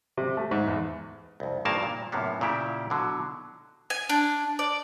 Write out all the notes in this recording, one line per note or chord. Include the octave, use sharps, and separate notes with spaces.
C3
A3
G#2
E2
C2 F2
G#1 G2 D#3 A#3 A#4 A5
A#2
F#2 A2 C3 A#3 B3
A#2 C#3 E4 G4
B2 D3 F#3
G#5
D4
D5